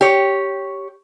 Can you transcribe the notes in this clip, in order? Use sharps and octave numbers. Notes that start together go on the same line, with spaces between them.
G4 C#5